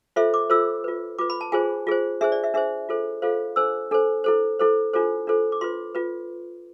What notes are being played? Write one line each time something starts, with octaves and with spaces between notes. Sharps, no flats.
F4 A4 C5 E5
D6
F4 A4 C5 E6
F4 B4
F4 B4 D6
B5
A5
F4 G#4 C5 G#5
F4 G#4 C5
D4 G#4 C5 E5
D5
E5
D4 G#4 C5 E5
F4 A4 C5
F4 A4 C5 F5
D4 A4 C5 E6
D4 A4 C5
E4 A4 C5
E4 A4 C5
D4 F4 A4 C5
D4 F4 A4 C5
D6
F4 B4 C6
F4 B4